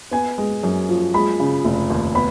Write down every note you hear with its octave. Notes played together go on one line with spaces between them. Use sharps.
B3 G#5
G#3
F#2
F3
G#3 B5
C#3
F1
D#2
B3 B5